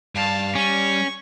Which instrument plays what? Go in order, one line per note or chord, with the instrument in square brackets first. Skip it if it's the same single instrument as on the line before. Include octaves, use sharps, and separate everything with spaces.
[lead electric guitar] G2 [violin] F5 A5
[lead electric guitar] G3 [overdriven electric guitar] C#4 [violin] C#6